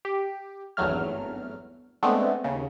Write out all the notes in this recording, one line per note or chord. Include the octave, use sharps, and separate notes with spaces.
G4
G#1 E2 G2 F#3 A3 F6
G#3 A3 B3 C4 D4
D#2 C#3